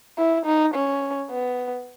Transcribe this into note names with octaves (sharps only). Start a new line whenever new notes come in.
E4
D#4
C#4
B3